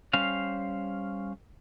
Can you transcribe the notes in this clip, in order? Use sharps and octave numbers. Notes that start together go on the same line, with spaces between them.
G3 C#4 C5 F5